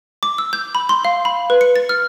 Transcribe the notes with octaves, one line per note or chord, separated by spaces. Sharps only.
D6
E6
G6
B5
C6
F5
B5
B4
C#7
A6
F6